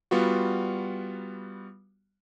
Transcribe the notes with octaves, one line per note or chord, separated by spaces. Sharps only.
G3 B3 F4 F#4